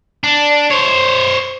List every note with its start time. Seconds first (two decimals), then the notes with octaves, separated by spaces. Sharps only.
0.24 D4
0.71 C5 C#5